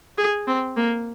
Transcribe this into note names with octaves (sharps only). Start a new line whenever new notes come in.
G#4
C4
A#3